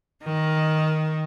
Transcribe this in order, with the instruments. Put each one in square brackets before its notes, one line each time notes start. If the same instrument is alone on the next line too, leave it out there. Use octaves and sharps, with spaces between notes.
[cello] D#3